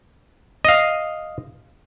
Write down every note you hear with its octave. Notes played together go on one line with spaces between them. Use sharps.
D#5 F5